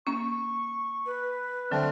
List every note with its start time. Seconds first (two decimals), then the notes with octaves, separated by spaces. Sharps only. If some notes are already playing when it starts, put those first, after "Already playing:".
0.07 A#3 C#4 C#6
1.06 B4
1.71 D3 F#3 A3 C4 D4 F6